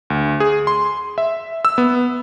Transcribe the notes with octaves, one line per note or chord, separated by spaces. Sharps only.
D2
G#4
C6
E5
E6
B3